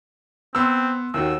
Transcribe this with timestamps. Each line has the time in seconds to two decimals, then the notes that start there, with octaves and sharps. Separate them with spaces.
0.55 B3 C4 C6 E6
1.14 D#2 D#3 F#4 E6